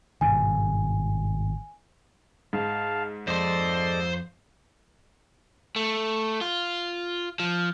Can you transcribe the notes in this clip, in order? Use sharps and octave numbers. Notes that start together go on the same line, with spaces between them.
G#1 G2 B2 G#5
G#2 F5 A5
F2 A4 C5 D5 D#5 C6
A3
F4
F3